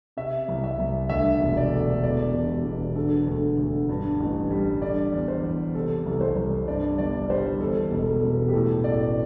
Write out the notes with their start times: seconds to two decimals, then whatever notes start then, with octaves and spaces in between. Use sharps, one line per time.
0.17 C3 E5
0.48 C2
0.64 E5
0.79 C2
1.09 D2 E5
1.41 E1
1.57 D5
1.71 A3
2.03 E2 D5
2.34 E1
2.65 E1
2.96 D3 A4
3.27 D2
3.58 D2
3.89 G2
4.20 A1
4.50 G3
4.81 D3 D5
5.12 E2
5.28 C5
5.43 E2
5.75 C3 A4
6.06 C2
6.12 A4
6.21 C5
6.36 C2
6.68 G2 D5
6.98 G1 D5
7.30 G3 C5
7.61 E2 A4
7.91 E1
8.07 A4
8.22 E1
8.48 G4
8.53 A2 A4
8.84 A1 D5